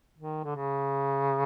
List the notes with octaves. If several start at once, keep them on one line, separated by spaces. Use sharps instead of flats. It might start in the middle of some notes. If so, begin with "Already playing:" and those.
D#3
D3
C#3